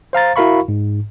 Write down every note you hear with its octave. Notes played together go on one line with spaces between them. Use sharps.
C5 F5 A#5 A6
E4 F#4 A#4 F5 B5 C#6
G#2